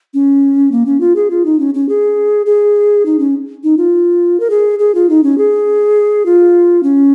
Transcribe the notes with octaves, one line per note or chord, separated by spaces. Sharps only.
C#4
A#3
C#4
F4
G#4
F4
D#4
C#4
C#4
G#4
G#4
D#4
C#4
D#4
F4
A#4
G#4
G#4
F4
D#4
C#4
G#4
F4
C#4